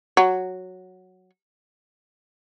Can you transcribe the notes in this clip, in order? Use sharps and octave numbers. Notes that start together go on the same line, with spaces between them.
F#3